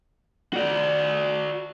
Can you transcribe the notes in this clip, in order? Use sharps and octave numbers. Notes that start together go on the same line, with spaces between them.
F#4 D5